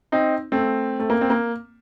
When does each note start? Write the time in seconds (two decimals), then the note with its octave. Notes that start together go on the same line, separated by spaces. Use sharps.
0.12 C4 D#4
0.52 A3 C4
1.00 A3
1.10 A#3
1.21 C4
1.30 A#3